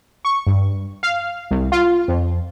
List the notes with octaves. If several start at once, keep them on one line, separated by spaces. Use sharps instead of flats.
C#6
G2
F5
C2
F4
F2